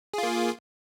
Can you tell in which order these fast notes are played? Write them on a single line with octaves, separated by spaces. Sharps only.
G#4 F4 A#3